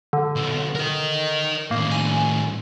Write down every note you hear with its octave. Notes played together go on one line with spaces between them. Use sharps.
D3
B1 B2
A#4 D#5
A2 D#3 A#3
G#5